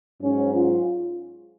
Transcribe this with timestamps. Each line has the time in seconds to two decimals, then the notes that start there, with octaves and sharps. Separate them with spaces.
0.21 G#2 F#3 C#4
0.53 F4